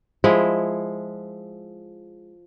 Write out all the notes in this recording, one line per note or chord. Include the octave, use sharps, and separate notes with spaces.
F3 G#3 E4